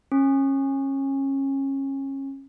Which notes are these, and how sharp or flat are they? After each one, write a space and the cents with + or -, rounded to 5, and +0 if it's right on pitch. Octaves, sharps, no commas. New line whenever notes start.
C#4 -25 C#6 +0